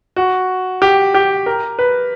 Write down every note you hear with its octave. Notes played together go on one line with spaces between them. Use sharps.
F#4
G4
G4
A#4
B4